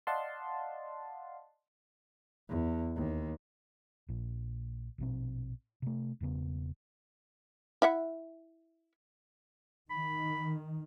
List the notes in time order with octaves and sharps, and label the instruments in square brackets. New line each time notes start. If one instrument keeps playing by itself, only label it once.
[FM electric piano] D5 D#5 F5 F#5 A5 C6
[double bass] E2
D#2
[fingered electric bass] A#1 A#2
A#1 B2 C4
C3 A3
E1 E2 C#3 B3
[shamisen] E4 E5 F#5
[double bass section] D#3 [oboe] B5